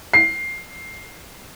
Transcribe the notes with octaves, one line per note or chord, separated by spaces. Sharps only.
C7